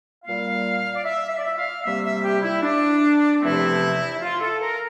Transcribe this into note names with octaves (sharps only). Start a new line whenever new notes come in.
A#2 G3 A#3 F5
D5
E5
E5
D5
E5
F5
C3 G3 A#3 E5
E5
G4
E4
D4
E2 C3 F3 A3 C4 E4
F4
A4
A#4